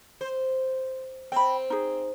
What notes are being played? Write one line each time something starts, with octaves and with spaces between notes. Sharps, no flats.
C5
C4 G5 B5
D#4 G#4